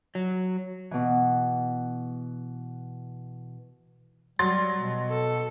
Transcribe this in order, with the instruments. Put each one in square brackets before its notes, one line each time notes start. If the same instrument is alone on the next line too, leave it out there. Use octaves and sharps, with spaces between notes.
[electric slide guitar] F#3
[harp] B2 E3
[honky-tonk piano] F#3 C6 A6 [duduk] G3
[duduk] B2
[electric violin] A4